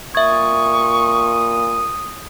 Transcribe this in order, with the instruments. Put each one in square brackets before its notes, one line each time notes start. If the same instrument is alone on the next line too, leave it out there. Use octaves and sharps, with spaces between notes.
[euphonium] A#2 [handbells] E5 G#6 [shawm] C#6 [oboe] D#6